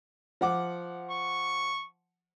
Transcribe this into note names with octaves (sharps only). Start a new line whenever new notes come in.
F3 F#5 D6
C#6